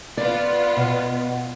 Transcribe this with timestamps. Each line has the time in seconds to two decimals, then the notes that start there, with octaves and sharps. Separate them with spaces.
0.17 B3 F4 D5
0.76 B2